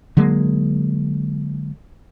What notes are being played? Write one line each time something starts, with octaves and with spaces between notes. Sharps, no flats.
D3 F#3 G#3 A#3